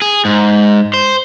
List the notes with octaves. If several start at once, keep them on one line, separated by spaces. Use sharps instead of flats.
G#4
G#2
C5